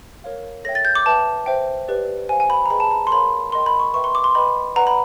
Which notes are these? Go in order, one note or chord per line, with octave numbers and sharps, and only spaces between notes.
A#4 C#5 F5
A4 C#5 E5 G5 A#6
A6
G6
D6
B4 E5 G5 A5
C5 E5 G5
G4 B4 D5
C5 F5 G#5
G#5
B5
A#5
G#4 B4 D#5 G5 B5
A5
A#5
C6
A#4 C#5 F5 B5
A#4 D#5 G5 C6
B5
C#6
B4 E5 G5 C#6
C6
D6
C6
B4 D#5 G5 B5
B4 D5 F#5 A#5
B5